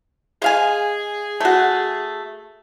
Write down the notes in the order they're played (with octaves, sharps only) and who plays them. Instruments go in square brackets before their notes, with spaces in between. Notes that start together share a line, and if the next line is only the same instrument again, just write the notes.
[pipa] G#3 F5 G#5 [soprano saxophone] G#4
[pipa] A3 F#4